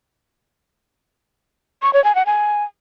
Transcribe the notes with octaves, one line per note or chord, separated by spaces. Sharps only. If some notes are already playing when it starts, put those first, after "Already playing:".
C#6
C#5
G#5
F#5
G#5